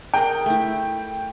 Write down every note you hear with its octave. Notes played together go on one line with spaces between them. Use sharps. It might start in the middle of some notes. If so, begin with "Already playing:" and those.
G#4 A#4 F#5 G5
A3 E4